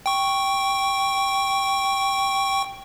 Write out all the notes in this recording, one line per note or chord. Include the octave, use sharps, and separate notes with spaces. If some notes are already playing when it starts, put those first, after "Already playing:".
G5 C#6